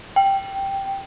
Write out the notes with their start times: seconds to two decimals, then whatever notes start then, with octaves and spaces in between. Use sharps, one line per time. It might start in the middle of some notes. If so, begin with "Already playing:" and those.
0.16 G5